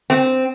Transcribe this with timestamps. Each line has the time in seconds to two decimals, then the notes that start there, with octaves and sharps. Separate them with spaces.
0.10 C4